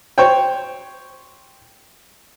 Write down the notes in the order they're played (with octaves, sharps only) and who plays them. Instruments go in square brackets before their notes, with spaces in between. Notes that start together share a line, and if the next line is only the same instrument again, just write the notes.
[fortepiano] C5 C#5 G5